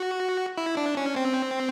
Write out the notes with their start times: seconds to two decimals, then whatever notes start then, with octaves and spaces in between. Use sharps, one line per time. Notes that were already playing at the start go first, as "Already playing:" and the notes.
Already playing: F#4
0.58 E4
0.77 D4
0.97 C#4
1.16 C4